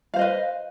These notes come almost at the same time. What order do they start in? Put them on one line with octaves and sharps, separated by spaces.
F5 C5 D#5 B4